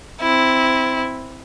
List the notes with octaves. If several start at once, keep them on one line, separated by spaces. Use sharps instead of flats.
C4 E4